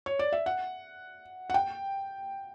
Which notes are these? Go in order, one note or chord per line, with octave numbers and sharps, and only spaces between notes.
C#5
D5
E5
F#5
F#5
G5